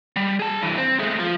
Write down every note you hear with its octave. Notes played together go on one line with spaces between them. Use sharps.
G3
G#4 A5
G2 E3
C4
G#3 A3
F3